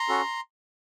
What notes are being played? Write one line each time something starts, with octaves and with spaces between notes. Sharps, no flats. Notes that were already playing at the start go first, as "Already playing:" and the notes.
Already playing: A#5 C6
C#4 F#4 A4